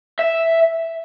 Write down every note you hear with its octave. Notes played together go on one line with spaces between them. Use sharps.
E5